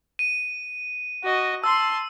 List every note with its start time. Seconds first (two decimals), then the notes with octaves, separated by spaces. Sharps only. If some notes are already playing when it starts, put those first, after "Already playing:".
0.19 D#7
1.24 F#4 D#5
1.64 A5 C6 E6